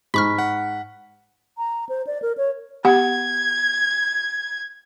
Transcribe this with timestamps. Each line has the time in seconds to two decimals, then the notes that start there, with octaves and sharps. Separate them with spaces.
0.14 G#2 B5 C#6 F6 B6
0.38 F#5
1.58 A#5
1.89 C5
2.07 D5
2.22 A#4
2.37 C#5
2.85 B3 G4 F#5 G#6